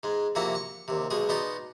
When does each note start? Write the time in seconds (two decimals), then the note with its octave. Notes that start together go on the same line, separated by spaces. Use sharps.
0.03 G#2 G#3
0.35 F2 C3 A#3 E4 F#4 F#5
0.55 C#6
0.88 D#2 C3
1.10 B1 B2 G#3 G#4
1.29 B2 B3 D#4 D5 C6